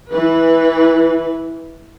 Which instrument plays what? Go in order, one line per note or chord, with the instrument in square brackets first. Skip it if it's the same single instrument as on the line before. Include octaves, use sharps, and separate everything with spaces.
[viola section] E3 B4